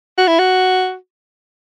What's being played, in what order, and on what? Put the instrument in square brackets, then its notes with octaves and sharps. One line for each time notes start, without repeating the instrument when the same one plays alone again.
[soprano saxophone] F#4
E4
F#4